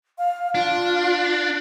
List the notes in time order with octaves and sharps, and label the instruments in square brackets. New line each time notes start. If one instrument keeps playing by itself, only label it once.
[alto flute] F5
[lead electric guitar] D4 [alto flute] F4